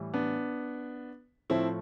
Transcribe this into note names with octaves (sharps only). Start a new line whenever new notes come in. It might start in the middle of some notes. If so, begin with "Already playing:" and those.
Already playing: A2 E3 G3
B3 D4
A2 F3 A3 C4 E4